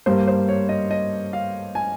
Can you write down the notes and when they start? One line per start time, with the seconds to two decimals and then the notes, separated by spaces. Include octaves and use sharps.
0.06 G2 G3 A#3 C5
0.27 C5
0.49 C#5
0.69 D#5
0.91 D#5
1.33 F5
1.75 G#5